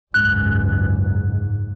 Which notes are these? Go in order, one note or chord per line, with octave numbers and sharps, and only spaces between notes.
F#1 C#2 G#2 F#6